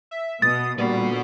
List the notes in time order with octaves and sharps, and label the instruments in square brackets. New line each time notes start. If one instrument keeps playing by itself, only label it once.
[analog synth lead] E5
[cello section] B2 [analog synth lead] D#6 [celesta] A6
[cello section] A#2 D3 [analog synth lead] G3 [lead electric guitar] B3 F#4